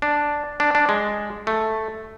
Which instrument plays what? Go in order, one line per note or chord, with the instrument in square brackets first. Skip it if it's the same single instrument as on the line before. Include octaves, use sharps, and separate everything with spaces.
[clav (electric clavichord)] D4
D4
D4
G#3
A3